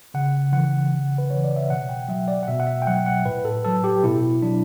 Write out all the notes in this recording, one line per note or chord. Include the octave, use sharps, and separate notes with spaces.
C#3 F#5
E3 F#5
C#3
B4
E3 C#5
D5
E5
B2 F#5
G5
F#3 E5
D5
F#5
B2 E5
F#5
E5
G5
F#3 F#5
F#5
A2 B4
A4
F#3 A4
G4
B2 E4
F#3 D4